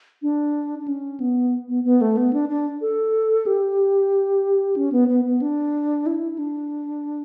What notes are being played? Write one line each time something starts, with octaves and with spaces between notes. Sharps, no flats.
D4
D4
C#4
B3
B3
B3
A3
B3
D4
D4
A4
G4
C#4
B3
B3
B3
D4
E4
D4